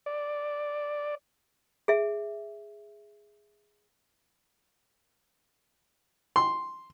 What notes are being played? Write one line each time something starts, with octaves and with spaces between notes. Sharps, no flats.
D5
G#4 E5
C6